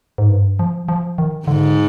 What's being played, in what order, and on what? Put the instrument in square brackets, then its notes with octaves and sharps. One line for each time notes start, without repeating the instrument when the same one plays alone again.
[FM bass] G#2
G2
F3
F3
D#3
[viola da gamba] G#2 [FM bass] D3